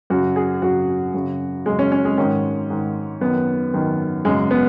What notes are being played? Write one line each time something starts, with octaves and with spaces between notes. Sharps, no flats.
F#2 C#3 F#4
G#4
F#2 C#3 F#4
F#2 C#3
F#2 C#3 G#3
C#4
C#4
G#3
G#2 D#3 C#4
G#2 D#3
F#2 D#3 B3
F#2 D#3
F#2 C#3 G#3
B3